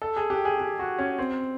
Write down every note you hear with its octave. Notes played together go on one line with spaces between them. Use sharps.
A4
G#4
G4
G#4
G4
F#4
C#4
C4